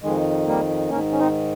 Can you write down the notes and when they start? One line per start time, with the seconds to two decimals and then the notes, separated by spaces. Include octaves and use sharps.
0.03 F2 D#3 G#3
0.47 G3 A#3
0.90 G#2 D#3 A#3 C#4
1.12 C#4
1.19 C4 D#4